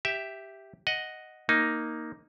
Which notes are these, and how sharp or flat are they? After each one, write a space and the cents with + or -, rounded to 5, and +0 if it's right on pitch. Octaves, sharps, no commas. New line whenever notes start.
G4 +0 E5 +0
D#5 +0 F#5 +0
A#3 +0 D#4 +0